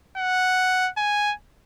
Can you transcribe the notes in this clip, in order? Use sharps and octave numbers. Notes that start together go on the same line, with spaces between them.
F#5
G#5